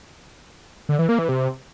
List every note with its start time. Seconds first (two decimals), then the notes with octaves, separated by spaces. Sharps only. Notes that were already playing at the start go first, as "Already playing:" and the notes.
0.89 D3
0.99 E3
1.09 A#3
1.19 E3
1.29 C3